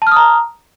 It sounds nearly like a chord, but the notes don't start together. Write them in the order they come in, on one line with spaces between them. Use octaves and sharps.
A5 F6 D#6 A#5